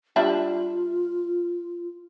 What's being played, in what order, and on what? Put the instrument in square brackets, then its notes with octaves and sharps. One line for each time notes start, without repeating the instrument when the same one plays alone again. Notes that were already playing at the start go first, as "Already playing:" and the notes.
[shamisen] G3 D4 E4 [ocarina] F4